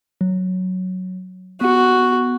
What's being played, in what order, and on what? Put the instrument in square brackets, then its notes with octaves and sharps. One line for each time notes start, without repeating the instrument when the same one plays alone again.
[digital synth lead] F#3
[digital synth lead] B3 [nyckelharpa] F#4